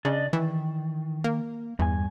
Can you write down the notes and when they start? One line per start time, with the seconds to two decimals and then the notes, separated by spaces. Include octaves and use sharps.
0.05 C#3 D4 D5 D#5
0.33 D#3 E3
1.24 A#3
1.79 E2 G2 G#5